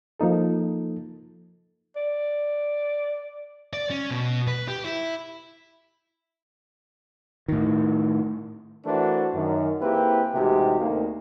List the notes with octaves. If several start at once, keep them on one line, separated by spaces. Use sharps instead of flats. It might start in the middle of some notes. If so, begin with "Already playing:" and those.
F3 A#3 D#4 A4
D5
D5
C#4
B2
B4
G4
E4
A2 D#3
E3 A3 D4 F#4 A#4 C5
F#2 D#3
A#3 C4 E4 G4 G#4 B4
A1 C3 G#3 D#4 F#4 G4
D2 D#3 A#3